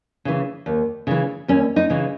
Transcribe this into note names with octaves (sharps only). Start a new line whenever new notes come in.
C#3 E3
D#2
C#3 E3
D#2 C#4
D#4
C#3 E3